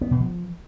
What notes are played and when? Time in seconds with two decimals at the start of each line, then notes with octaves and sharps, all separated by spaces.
0.01 B3
0.11 B2
0.21 F3